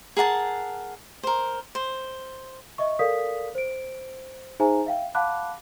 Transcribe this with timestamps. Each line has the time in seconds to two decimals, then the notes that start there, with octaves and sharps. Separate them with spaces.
0.17 G#4 A#4 F#5 A5
1.23 A#4 C5
1.75 C5
2.78 D#5 E5 C#6
2.99 A4 A#4 D5 F5 D#6 B6
3.55 C5 D7
4.60 D#4 G#4 C5 E5 G#5 A#5
4.86 E5 F5 G5
5.15 F5 F#5 A5 B5 D6 F#6